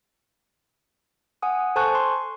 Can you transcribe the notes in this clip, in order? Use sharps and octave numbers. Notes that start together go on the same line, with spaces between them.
F#5 G#5 D#6
A4 C5 G#5 A5 C#6 F#6
C6